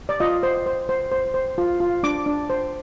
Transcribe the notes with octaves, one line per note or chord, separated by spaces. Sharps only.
D5
F4 D#5
C5
C5
C5
C5
C5
F4
F4
D4 D6
D4
C5